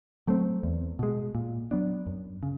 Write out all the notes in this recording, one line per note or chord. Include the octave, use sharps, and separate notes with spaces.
F#3 A3 C4
E2
B2 G#3
A#2
F#3 B3 D4
F#2
C#3